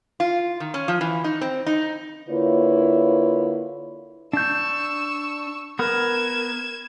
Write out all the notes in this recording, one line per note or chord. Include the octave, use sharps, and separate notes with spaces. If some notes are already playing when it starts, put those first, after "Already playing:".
F4
D#3
C#4
F3
E3
D#4
C4
D#4
D3 A#3 E4 F4 B4 C#5
D4 C#6 E6 G6
B3 A#4 G#6 E7